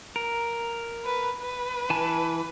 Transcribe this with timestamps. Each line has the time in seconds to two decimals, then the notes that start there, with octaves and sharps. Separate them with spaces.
0.16 A#4
1.05 B4
1.41 B4
1.90 E3 G#5 A5